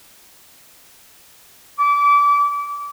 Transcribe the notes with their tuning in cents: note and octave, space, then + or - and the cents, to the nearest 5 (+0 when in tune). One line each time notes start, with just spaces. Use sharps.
D6 -30